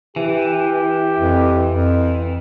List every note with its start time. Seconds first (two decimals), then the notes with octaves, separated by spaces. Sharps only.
0.16 E3 G4
1.18 F2
1.70 F2